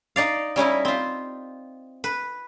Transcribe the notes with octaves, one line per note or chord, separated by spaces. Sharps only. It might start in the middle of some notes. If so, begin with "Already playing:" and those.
D#4 D5 F5
G3 C#4 D#4 E4
C4 F4
B4